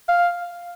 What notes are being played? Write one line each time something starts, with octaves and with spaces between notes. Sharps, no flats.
F5